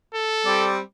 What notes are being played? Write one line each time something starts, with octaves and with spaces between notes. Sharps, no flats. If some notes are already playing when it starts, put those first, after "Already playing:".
A4
G3 C4 D5